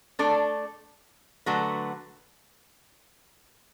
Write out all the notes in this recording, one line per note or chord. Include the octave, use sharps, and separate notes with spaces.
A3 D4 A4 D5
D3 F#3 A3 F#4 B4